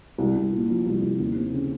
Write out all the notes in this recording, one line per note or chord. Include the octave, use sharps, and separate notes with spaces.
C2
C2
A#2
F3
C2
C2
D#2
C4
C#3